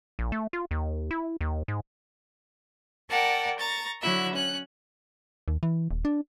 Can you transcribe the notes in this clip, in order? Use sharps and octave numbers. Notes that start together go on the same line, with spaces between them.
A#1
A3
F4
D#2
E4
D#2
G#2
A#4 D5 F#5 G5 A5
A#5 C#6 A6
D3 F#3 E4 E5 F#6
C#4 F#6
D#2
E3
D#1
D4